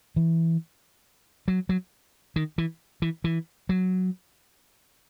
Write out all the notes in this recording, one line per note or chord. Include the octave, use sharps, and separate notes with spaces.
E3
F#3
F#3
D#3
E3
E3
E3
F#3